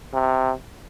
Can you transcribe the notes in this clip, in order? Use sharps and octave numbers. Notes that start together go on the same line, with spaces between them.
C3